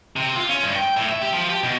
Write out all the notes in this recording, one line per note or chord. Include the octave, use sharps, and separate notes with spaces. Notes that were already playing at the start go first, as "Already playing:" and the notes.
C3
F4
C#4
G2
G5
A2
E5
G4
F3
G4
B2